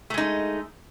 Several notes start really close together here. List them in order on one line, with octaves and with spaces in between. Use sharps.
A3 G#3 D#4